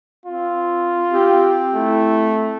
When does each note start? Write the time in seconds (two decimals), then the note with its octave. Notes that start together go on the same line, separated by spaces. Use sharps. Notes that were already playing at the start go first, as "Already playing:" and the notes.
0.26 C4 F4
1.11 C4 G4
1.75 A3 E4